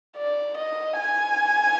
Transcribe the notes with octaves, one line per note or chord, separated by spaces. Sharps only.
D5
D#5
G#5